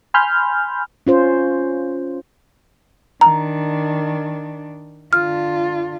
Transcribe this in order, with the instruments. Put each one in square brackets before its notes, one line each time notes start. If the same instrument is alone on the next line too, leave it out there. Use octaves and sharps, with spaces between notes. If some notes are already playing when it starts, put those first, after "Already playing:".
[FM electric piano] G#5 B5 C6 F6 G6
[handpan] C#4 F4 C5
[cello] D#3 D4 [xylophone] A#5
[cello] D3 F4 [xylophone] F6